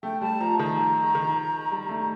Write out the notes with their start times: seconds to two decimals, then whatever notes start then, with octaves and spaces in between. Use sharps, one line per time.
0.03 A3 G5
0.21 G3 A5
0.40 F3 A#5
0.59 D#3 A#5
1.15 D#3
1.71 G3
1.89 A3